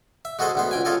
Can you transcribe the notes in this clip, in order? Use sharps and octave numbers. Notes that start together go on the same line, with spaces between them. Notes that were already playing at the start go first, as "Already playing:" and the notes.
E5
G#3 F#4 G#4 A4 C5 D#5
D2 B3 C5
C#2 G5 G#5
C#3 F4 G4 A4 D#5 G#5